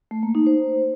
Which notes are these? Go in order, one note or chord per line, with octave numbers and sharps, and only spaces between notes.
A3
A#3
D#4
C5